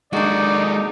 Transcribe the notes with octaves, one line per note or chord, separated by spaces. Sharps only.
G#3 A#3 D4 D#4 F#4 D5